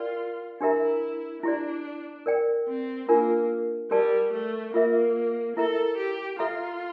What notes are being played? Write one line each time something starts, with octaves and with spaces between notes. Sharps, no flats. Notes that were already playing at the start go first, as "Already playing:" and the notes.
Already playing: F4 A#4 D5 G5
D4 E4 G4 A#4 E5 A#5
D4 E4 G4 D5
A#4 D5 G5
C4
A#3 D4 F4 A#4
G3 G4 A#4 D5 A5
A3
A#3 F4 A#4 E5
E4 A4 A#4 E5 A#5
G4
F4 A4 E5 A#5